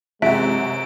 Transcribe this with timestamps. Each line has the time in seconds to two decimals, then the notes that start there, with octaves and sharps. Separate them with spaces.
0.22 F#2 C3 G#3 F#4 E5 D7